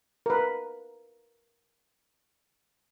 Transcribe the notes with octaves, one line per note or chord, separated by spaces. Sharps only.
A#4 B4